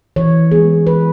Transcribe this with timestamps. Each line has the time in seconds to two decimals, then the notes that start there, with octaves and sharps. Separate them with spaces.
0.16 E3 C#5
0.51 G#3 B3 G#4
0.87 E3 B4